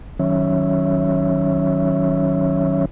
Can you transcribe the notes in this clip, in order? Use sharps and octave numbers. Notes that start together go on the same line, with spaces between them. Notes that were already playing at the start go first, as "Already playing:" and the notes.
D#3 F#3 C#4 C#5 E5